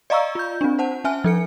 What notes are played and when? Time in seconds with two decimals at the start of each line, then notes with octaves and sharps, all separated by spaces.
0.10 D5 D#5 F5 A#5 C#6 E6
0.35 F4 G6
0.61 C4 D4
0.79 C5 F#5 A5
1.04 C#4 E5 G#5 F6
1.24 F3 A4 C#7